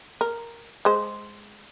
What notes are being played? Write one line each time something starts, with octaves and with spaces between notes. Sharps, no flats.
A#4
G#3 C5